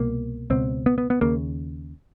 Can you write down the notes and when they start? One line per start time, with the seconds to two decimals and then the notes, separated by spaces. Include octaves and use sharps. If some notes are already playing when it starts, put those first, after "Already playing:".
Already playing: C2 B2 A#3
0.50 C#2 B2 C4
0.86 B3
0.98 B3
1.10 B3
1.21 D#2 C#3 A#3